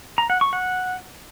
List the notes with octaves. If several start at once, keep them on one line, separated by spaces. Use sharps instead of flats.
A#5
F#5
C#6
F#5